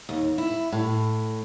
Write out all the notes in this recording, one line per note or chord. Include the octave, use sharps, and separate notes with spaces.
D#2
E4
A2